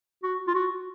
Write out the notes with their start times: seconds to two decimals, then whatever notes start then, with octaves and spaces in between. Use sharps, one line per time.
0.23 F#4
0.47 F4
0.55 F#4